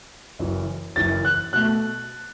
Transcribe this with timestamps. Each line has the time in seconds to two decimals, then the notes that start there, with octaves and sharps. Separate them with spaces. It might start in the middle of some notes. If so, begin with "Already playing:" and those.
0.39 F#1 F#2 E3
0.96 F#1 F#2 E3 A6
1.25 F#6
1.53 B2 A3 F#6